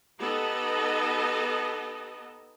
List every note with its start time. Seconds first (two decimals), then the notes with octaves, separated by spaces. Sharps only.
0.20 B3 D#4 G4 A4 D#5